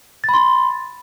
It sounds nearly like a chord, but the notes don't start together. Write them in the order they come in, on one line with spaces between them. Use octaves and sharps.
A6 B5 C6